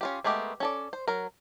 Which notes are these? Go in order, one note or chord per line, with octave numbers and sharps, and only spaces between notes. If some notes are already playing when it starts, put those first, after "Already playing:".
C#4 F4 G4
G#3 A3 B3 G4 A#4
C#4 A4 D5
C5
F#3 A#4